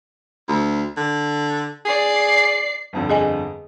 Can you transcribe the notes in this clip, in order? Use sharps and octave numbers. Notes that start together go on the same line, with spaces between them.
D2
D3
G#4 D5 C7
G1 F2 D3
G#4 D#5 G#5